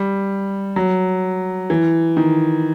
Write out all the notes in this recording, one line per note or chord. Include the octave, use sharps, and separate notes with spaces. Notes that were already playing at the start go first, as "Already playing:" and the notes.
Already playing: G3
F#3
E3
D#3